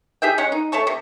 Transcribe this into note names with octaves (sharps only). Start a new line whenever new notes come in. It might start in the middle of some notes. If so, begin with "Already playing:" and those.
G4 G#4 E5 G5
G#3 C#4 C#5 F#5
D#4
A3 C#5 A5 C#6
C3